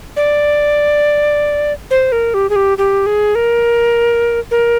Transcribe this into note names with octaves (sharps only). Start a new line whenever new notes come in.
D5
C5
A#4
G4
G#4
G4
G4
G#4
A#4
A#4